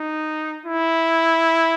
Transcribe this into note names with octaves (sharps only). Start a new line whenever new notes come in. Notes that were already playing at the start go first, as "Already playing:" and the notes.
Already playing: D#4
E4